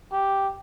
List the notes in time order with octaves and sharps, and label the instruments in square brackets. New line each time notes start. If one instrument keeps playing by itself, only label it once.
[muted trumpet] G4